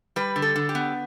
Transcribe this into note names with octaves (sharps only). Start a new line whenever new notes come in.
G3 B4
D3
A4
D3
G4
B3